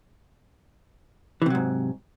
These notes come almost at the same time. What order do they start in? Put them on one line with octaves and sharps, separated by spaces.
E3 C3 F#3 G#2